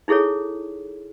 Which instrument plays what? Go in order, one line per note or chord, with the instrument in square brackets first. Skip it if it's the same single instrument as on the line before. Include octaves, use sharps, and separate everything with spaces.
[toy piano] D#4 E4 G#4 A4 C#5